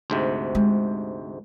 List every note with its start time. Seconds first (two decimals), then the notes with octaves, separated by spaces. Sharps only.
0.10 D2 G#2 C3
0.55 G#3